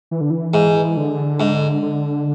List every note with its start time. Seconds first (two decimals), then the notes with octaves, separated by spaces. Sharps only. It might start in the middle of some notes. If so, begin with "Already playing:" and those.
0.11 E3
0.21 D3
0.30 E3
0.54 G#2
0.97 D3
1.40 G#2
1.82 D3